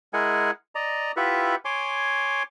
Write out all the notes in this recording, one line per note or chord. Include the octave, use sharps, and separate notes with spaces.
G#3 E4 G#4 A#4 F#5 G#5
D5 D#5 A#5
E4 F4 G4 B4 E5 F#5
C#5 G#5 C6 D6